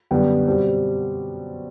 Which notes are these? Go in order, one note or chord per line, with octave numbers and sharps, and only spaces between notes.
F#2 D3 G3 B3 G5
B2 G3 C4